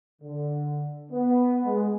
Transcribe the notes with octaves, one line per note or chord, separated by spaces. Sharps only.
D3
B3
G#3